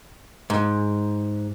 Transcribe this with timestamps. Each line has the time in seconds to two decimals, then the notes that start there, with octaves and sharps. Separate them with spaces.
0.50 G#2